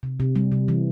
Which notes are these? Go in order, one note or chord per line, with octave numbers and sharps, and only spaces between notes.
C3
C3
G3
C3
E3